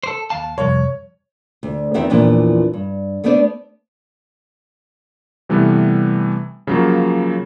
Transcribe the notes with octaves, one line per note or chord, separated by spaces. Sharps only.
A4 C5
D#2 F5 A5
C2 F2 C#5
D2
E2 D#3 B3 C4 D#4 E5
E2 A#2 E3 F3 D4
G2
A3 B3 D4 C5 D5
C3 E3 G3 A3 B3
C#3 F3 F#3 G#3 A#3